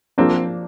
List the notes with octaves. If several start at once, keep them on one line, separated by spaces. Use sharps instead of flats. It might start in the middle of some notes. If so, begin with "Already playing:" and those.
F3 A#3 C4 D4